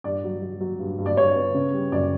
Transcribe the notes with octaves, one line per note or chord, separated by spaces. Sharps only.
G2 D5
F#3
F#3
F#3
G2
G2
D5
G2 C#5
B3
C#3
G3
F#2 D5